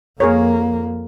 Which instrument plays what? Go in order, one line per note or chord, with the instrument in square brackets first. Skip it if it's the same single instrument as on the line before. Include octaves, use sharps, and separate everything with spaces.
[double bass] F2 A#3 [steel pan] G#4 A#4 C#5